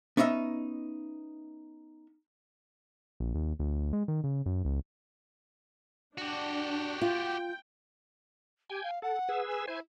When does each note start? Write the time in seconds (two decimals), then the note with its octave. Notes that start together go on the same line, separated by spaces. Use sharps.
0.17 B3 C#4 D#4 D#5 E5
3.20 A#1
3.34 D#2
3.59 D2
3.93 G#3
4.08 D#3
4.24 C#3
4.46 F#2
4.65 C#2
6.18 D4 F#4 G4
7.01 F4 G5
8.70 G4 G5 G#5
8.83 F5
9.02 A4 F#5
9.29 G#4 B4 E6
9.48 G#5
9.67 E4 C5 G#5